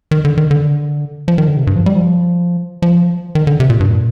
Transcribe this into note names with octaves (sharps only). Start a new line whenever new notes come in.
D#3
D3
D#3
D3
F3
D#3
D3
C3
G2
F3
G3
F3
F3
D#3
D3
C3
A#2
G2
A#2